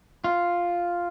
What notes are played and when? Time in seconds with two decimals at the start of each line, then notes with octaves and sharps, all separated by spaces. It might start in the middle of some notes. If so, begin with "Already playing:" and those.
0.24 F4